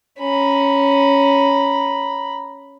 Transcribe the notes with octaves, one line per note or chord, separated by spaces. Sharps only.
C#4 A#5 B5